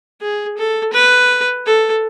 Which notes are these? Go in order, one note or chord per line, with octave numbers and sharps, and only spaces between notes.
G#4
A4
B4
A4